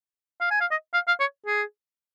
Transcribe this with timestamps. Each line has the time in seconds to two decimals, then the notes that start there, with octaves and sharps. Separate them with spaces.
0.41 F5
0.51 G#5
0.61 F5
0.71 D#5
0.94 F5
1.08 F5
1.20 C#5
1.46 G#4